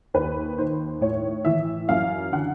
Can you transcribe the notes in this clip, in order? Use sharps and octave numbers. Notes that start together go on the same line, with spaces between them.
D#2 B4
D#3 C5
A2 C#5
E3 E5
F#2 F5
D3 F#5